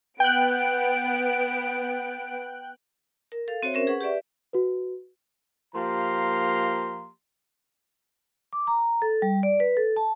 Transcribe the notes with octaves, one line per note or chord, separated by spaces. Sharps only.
B3 G5 F#6 D7
A#4
A4 F5
C4 F#4 C5 C#5 E5
C#4 A#4 C5
G#4 B4 F#5 C#6
G4 B4 D5 E5
F#4 B4
F3 A#3 G4 F5 A#5 C6
D6
A#5
A4
G3
D5
B4
A4
A5